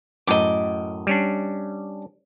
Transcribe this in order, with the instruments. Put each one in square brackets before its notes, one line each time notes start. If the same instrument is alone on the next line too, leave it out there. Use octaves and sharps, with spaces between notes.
[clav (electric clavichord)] F#2 A2 [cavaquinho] D#5 D6
[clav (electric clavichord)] G3 C#4 D4